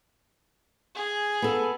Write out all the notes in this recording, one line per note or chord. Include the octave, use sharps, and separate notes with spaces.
G#4
B3 A4